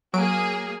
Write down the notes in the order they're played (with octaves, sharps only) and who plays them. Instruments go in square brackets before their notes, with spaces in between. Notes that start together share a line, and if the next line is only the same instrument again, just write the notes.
[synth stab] F#3 D7 [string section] A#3 G#4